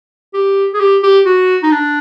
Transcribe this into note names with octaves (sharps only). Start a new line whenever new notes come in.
G4
G#4
G4
G4
F#4
D#4
D4